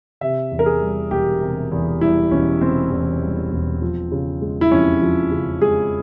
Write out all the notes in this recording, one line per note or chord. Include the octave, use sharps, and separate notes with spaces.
C3 E5
E2
A#4
G#4
G3
E1 G4
C3
E2
G3 E4
E1 C#4
C3 C4
E2
G3
E1
F3
C#3
G#3
E4
F2 C#4
F3
C#3
G#3 G#4